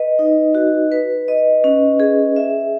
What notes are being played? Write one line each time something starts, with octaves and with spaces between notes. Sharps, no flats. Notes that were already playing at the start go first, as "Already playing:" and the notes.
Already playing: B4 D#5
D#4
F#4
B4
D#5
C#4
G#4
E5